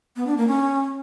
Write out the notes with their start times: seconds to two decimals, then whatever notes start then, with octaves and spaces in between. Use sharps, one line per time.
0.16 B3
0.27 D4
0.37 A#3
0.48 C#4